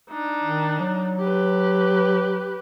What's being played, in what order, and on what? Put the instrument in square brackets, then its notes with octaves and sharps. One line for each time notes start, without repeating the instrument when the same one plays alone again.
[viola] D4 D#4
[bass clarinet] D#3
F#3
[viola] G4 B4